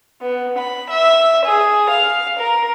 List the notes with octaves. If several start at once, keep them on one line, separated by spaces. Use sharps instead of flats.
B3
B5
E5
G#4
F5
A#4